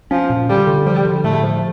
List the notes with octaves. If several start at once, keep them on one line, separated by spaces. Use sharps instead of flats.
F3 C#4
A#2
D3 G3
D3
F3 G3
D3
A2 A3
F3